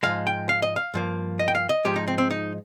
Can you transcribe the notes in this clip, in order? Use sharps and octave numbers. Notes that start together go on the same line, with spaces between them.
G#2 F3 G#3 F5
G5
F5
D#5
F5
G2 F3 A#3
D#5
G5
F5
D#5
G#2 F3 G#3 G4
D#4
C4
C4
D#4